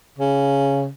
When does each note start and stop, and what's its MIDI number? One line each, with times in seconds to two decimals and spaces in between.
0.19 0.88 49